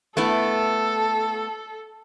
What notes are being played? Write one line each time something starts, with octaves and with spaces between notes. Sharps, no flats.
A3 B3 E4 A4